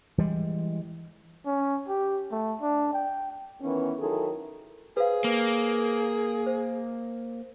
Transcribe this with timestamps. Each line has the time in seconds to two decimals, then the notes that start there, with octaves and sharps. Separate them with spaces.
0.18 E3 G3 G#3
1.46 C#4
1.88 G4
2.32 A3
2.61 D4
2.93 G5
3.61 D#3 E3 B3 C#4
3.99 D#3 F#3 E4 G#4 A4
4.97 G#4 B4 C5 F5
5.24 A#3
6.47 C5